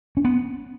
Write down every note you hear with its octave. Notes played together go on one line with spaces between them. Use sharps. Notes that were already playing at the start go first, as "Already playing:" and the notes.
C#4
B3